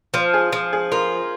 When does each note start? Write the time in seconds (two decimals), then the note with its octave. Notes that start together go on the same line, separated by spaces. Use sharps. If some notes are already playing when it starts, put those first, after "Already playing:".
0.14 F3 C5
0.34 G#4
0.52 F3
0.73 G#4
0.92 F4 A#4